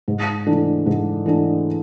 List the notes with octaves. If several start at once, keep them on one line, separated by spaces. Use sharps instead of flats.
G#2
E3 A3 D4
G#2
E3 A3 D4